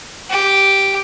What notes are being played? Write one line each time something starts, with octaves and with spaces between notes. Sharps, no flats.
G4